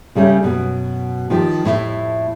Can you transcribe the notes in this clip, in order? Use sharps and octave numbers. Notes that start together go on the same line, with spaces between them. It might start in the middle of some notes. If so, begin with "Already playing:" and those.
C#3 G3 A3 C#4
F#2 B2
D#3 F3 G4
F2 A2 E4